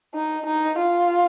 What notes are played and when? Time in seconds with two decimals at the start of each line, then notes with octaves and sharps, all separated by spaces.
0.14 D#4
0.46 D#4
0.78 F4